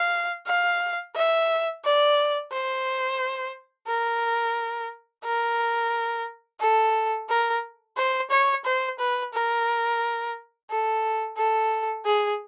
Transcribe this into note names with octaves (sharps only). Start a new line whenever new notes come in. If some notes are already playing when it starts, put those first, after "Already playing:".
Already playing: F5
F5
E5
D5
C5
A#4
A#4
A4
A#4
C5
C#5
C5
B4
A#4
A4
A4
G#4